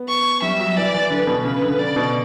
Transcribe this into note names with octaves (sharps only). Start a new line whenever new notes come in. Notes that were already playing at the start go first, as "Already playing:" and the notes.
Already playing: B3
C#6
G3 E5
F#3
E3 D5
E3
D3 B4
B2
C#3 B4
D3
C#3 D5
B2